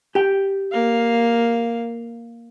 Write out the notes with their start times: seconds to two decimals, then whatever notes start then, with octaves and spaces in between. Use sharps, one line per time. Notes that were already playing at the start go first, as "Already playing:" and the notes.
0.15 G4 G5
0.72 A#3 F5